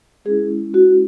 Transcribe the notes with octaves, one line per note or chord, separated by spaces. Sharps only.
G#3 C#4 E4 G#4
F#4